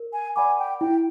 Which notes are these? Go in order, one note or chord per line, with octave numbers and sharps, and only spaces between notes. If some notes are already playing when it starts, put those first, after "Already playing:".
Already playing: A#4
G#5
D5 F#5 G#5 B5 D6
G5
E4 G5